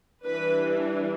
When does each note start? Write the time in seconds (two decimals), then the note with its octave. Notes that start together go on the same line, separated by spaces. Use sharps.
0.25 E3 G3 D4 B4